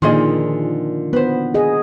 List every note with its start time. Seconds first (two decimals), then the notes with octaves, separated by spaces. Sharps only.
0.02 A#2 D3 D#3 F3 F4 G#4 D#5
1.13 B3 B4 C5
1.54 G#4 D#5